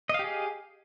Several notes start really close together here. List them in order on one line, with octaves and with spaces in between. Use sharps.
D#5 F5 G4 G#4